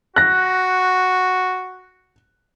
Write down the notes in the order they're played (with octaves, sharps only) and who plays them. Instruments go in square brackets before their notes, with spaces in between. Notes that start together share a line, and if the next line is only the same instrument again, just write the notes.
[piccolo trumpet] F#4 [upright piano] F#6 A#6